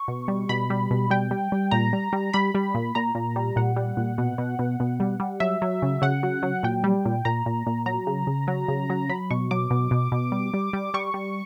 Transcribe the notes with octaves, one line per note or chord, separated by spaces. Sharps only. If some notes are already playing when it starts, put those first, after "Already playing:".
Already playing: C#6
B2
G3
B2 B5
G3
B2
G3 G5
G3
G3
A#2 A#5
G3
G3
G3 B5
G3
A#2
A#2 A#5
A#2
G3
A#2 F#5
G3
A#2
B2
B2
B2
B2
G3
G3
F#3 E5
F#3
C#3
C#3 F#5
F#3
F#3
A#2 G5
G3
A#2
A#2 A#5
A#2
A#2
F#3 A#5
C#3
C#3
F#3
C#3
F#3
F#3 B5
B2 C#6
F#3 D6
B2
B2
B2
G3
G3
G3
G3 C#6
G3